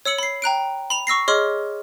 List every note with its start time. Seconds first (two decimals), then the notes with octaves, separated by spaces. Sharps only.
0.05 C#5 E6 C#7 F#7
0.18 B5 C7
0.42 G5 A#5 F#6 D7
0.90 B5 F7
1.07 C#6 E6 A#6 C7
1.28 G#4 C#5 D#5 C6 D6 F6